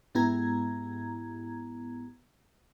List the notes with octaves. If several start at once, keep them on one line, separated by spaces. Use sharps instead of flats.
G#2 B3 E4 G4 A#5 G#6